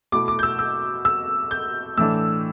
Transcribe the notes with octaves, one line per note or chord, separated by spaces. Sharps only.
B2 A3 E4 D6
D6
G6
E6
E6
E6
G6
A2 E3 A3 D4 E6